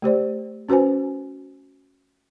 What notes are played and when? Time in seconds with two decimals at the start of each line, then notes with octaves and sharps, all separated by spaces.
0.02 A3 G4 C5 D5
0.69 C#4 F#4 B4 C5 G#5